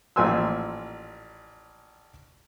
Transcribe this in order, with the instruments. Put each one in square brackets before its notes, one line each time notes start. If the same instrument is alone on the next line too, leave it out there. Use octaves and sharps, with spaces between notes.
[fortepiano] A1 A#2 F3 G#5 C6 E6